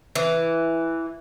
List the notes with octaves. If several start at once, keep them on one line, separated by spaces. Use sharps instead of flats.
E3